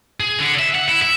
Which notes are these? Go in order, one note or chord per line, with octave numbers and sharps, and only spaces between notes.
G#4
D3
E5
F#5
E4
E5